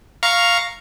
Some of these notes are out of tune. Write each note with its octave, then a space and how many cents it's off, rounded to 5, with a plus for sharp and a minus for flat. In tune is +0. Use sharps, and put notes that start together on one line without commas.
F5 +0 A#5 +0 C#6 +0